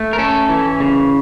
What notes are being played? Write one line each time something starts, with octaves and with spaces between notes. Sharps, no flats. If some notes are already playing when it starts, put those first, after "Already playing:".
Already playing: A3
A#4
C#4 A4
E3
C#3